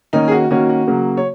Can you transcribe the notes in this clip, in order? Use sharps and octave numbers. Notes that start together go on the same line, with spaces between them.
D#3 A#3 C#4 D#4
G#4
F#4
D#3 A#3 C#4 F#4
F#4
C#3 F#3 A#3
C#5